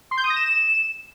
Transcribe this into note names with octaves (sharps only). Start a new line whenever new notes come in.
C6
G6
D#6
A#6
E7